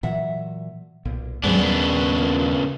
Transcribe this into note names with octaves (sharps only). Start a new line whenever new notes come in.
A#2 E3 F#3 E5 F#5
B1 A#2
D#2 G#2 C#3 F#3 G3 B3 D4
A#2
A#3 F4